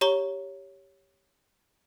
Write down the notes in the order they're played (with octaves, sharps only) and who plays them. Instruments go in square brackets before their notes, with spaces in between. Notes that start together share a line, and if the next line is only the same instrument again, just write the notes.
[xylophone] G4 C#5 A#5 C#6 G7